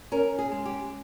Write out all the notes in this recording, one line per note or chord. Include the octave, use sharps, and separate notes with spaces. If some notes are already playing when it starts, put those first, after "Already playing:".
C#4 A#4
G#4
G#3
G4